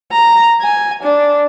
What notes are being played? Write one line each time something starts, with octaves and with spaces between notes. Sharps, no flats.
A#5
G#5
D4